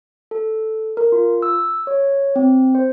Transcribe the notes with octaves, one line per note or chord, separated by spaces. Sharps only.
A4
A#4
F4
E6
C#5
C4
C5